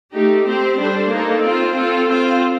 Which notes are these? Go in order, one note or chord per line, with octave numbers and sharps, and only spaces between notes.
A3 D#4 G4
C4 G4 C5
G3 D4 A4 C5
A#3 D#4 A4
C4 F4 C5
C4 F4 A4
C4 F4 C5